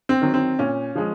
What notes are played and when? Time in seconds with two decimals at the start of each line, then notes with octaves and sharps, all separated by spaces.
0.09 C4
0.22 D#3 F#3
0.34 C4
0.59 A#2 C#4
0.95 F3 G#3